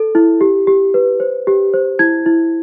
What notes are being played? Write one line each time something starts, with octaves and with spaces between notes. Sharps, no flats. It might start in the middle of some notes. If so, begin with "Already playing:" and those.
Already playing: A4
E4
G4
G4
B4
C5
G4
C5
E4 G#6
E4